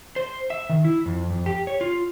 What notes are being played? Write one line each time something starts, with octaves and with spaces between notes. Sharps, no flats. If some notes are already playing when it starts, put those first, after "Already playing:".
C5
E5
D#3
E4
F2
F2
G4
C#5
F4